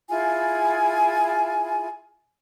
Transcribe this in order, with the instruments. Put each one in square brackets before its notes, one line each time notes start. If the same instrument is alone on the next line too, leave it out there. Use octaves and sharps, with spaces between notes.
[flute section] E4 F4 G#4 G#5